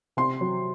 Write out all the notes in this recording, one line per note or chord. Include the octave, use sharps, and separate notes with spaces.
C3 C6
F#3